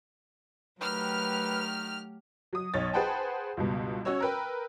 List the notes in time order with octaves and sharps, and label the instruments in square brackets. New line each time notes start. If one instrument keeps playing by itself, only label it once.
[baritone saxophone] D#3 [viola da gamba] F#3 A3 G4 [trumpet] B4 [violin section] F6
[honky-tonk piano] F#3 D#6
B1 C#5 A6
G#4 B4 C5 F#5 G5 A5
C#2 G2 B2
C#4 F#4 C#5 E6
A#4 B4 G5